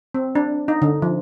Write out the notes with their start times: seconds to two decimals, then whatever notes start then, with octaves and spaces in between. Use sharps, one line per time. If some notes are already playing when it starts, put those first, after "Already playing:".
0.14 C4
0.35 D4
0.68 D#4
0.82 D3
1.02 F3